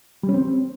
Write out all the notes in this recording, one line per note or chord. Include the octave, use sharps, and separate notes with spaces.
G3
C#4
C4